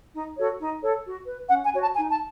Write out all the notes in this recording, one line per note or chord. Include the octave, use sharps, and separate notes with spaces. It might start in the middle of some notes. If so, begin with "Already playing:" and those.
D#4
F#4 A4 C#5
D#4
A4 C#5
F#4
B4
C#4 F#5
G#5
F#4 C#5
A5
D#4 G#5
A5